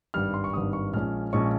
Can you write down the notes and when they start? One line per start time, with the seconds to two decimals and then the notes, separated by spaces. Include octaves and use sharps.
0.14 G#1 G2 G3 F6
0.34 C6
0.44 C#6
0.53 G#1 G2 G3 D#6
0.73 C#6
0.93 A#1 A#2 G#3 C#4 F6
1.33 A#1 A#2 G#3 C#4 C#6